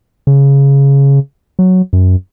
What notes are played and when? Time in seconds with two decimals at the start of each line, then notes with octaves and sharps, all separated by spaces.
0.27 C#3
1.59 F#3
1.93 F#2